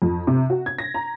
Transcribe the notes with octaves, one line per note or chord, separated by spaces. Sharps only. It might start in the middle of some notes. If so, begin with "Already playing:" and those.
F2
C3
F#4
G#6
A#6
A#5